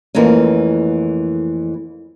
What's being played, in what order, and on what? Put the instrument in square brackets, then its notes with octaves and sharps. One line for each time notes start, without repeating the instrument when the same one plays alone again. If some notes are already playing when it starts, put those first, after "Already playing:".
[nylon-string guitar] F2 E3 A3 A#3 C#4